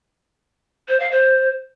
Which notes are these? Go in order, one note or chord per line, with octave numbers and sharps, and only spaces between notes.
C5
F5
C5